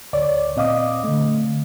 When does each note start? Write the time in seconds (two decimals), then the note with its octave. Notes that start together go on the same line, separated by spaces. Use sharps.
0.13 D2 C#5 D5
0.56 A#2 C4 D#5 F5 D6 D#6
1.04 D3 A3